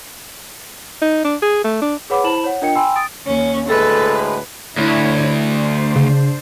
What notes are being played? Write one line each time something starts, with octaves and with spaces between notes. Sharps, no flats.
D#4
D4
G#4
A3
D4
G#4 B4 C#5 F#5 B5 D6
E4 C5 A5 B5 E7 F#7
C#5 F#5
D4 F4 A#4 D#5 G5 C#7
G5 G#5 B5 C6 E6
D#6 A6 D7
D#2 C#4
D2 A2 G#3 A4 B4
D2 D4 E4 C#5
D4 C5
C#3